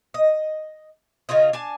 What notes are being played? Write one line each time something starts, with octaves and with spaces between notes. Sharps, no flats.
D#5
C#3 C#4 F4 D#5
D4 G#5 A5